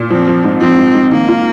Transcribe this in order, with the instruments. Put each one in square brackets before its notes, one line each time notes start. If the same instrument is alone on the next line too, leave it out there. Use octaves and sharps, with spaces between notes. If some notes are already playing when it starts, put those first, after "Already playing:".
Already playing: [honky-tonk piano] A#2
[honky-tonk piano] F3 [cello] C4
[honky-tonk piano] F3
G#2
[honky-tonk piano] F3 [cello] C4
[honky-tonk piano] G#2
G#2
[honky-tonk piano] D#3 [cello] A#3
[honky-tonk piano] F4